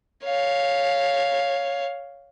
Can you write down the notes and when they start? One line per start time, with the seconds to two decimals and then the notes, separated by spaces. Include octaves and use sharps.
0.24 C#5 F5